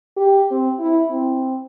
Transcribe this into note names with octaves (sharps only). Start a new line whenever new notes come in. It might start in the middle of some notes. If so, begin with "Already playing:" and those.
G4
C4
E4
C4